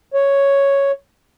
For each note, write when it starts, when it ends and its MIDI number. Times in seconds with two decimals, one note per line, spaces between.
0.14 0.91 73